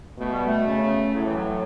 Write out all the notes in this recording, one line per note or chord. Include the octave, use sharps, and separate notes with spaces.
B2 A3
G3
A3
C#3
A2 F#3
E3
F#3